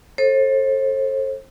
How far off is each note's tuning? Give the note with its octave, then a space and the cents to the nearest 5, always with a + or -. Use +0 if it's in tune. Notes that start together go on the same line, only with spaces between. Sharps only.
A4 +0 C5 +40